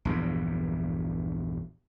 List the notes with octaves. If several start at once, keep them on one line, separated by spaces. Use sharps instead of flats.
A#1 E2 G2 A#2